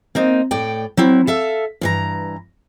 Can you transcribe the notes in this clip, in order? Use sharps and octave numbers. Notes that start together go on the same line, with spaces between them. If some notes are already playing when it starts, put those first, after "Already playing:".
A#3 C4 D#4
A2 D5 G5
F#3 C4 E4
A4 E5 F5
G2 E3 A#5